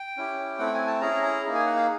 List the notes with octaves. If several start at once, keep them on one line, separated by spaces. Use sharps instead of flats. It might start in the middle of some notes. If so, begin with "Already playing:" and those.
Already playing: G5
C#4 E4 G4
A3 C4 E4 F#5
G5
G#5
A5
C#4 E4 G#4 A#5
A#5
A#3 D#4 G#4
G#5
F#5
F5